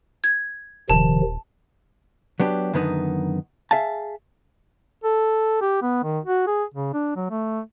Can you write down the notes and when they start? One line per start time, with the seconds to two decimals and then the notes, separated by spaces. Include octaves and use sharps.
0.24 G#6
0.90 D#1 C3 D#3 F3 A5
2.40 F#3 B3 D4 G4
2.73 F#2 D3 D#3 B3 C4 D#4
3.71 G#4 E5 F5 A5
5.04 A4
5.61 G4
5.82 B3
6.03 D#3
6.24 F#4
6.47 G#4
6.74 C#3
6.94 D4
7.16 F#3
7.30 A3